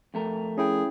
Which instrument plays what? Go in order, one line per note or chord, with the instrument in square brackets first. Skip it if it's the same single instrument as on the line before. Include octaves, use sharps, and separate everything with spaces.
[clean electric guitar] F2 A3 A#4
[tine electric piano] C#4 E4 G5 [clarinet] G#4